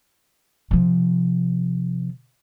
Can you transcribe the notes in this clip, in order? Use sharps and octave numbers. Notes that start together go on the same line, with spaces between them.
C3 F3